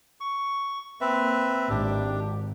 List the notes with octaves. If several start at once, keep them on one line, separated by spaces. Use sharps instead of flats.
C#6
A#3 C4 B4 E5
G#1 D4 G4